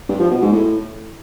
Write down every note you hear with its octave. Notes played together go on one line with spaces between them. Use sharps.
G2
F3
B2
G#2
A2